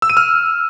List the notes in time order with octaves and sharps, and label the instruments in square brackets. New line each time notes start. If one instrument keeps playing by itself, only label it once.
[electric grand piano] E6
D#7
F6